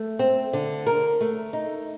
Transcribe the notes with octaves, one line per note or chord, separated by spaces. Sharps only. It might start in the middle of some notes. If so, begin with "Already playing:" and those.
Already playing: A3
C4
D3
A#4
A3
D#4